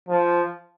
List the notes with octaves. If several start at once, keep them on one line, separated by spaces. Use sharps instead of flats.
F3